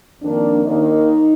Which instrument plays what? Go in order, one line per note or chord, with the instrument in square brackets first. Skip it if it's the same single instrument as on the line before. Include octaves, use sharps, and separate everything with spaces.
[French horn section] F2 D#3 A#3 D4
D#2 D#3 A#3 D#4